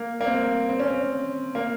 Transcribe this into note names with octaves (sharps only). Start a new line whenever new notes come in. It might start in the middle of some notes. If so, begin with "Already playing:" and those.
Already playing: A#3
A#3
C4
C4
C#4
C4
A#3